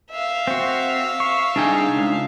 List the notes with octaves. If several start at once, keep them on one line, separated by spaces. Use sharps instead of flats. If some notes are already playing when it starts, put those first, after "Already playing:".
E5 F5
C4 F#4
C#6
C2 D4 D#4 G#4 G5
C#2